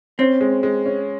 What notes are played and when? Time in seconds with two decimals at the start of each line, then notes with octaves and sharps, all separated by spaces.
0.19 C4 C#4
0.41 G#3
0.63 G#3
0.86 C#4